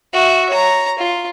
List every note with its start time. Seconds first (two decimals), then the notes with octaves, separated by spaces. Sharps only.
0.13 F#4 E5
0.49 C#5 A#5
0.99 F4